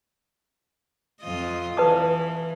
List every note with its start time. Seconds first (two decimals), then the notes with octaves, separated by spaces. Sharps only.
1.21 F2 F4 D#5
1.77 E3 B4 A5 D#6